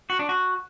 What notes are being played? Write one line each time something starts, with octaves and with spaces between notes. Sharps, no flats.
F#4
D4
F#4